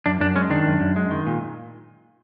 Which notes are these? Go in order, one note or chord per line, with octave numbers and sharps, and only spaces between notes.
F#2 D4
F#2 D4
G#3 C#4
D#3 D4
F#2
F#2
G#3
D#3
A#2